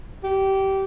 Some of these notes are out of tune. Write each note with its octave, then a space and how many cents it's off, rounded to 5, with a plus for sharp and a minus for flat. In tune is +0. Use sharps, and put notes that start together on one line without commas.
G4 -20